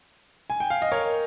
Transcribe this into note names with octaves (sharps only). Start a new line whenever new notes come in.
G#5
G5
F5
D#5
A#4 C#5